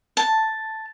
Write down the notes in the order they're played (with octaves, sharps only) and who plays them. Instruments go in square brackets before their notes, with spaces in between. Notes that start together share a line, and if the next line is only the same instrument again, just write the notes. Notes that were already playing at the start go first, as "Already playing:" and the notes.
[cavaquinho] A5